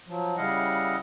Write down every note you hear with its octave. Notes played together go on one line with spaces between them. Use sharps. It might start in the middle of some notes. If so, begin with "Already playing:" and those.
F3 F#3
C#3 G3 E4 D#5 F5 F#5